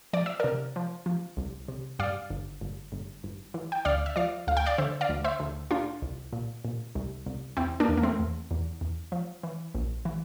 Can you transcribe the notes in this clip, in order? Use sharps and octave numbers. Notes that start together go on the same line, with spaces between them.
F3 D5
E5
C3 A#4 D5
F3
F3
C2
C3
G2 D5 F5
G1
G1
G1
G1
E3
G5
D2 D5 F5
E5
F3 D5 F5
D2 F5
G5
D5 F5
D3 C5 E5
D5 F5
D2
C5 E5
D2
A#2 D4 F4
C2
A#2
A#2
C2
C2
E2 C4 E4
A#3 D4
E2
A#3
A3 C4
E2
E2
E2
F3
E3
A#1
E3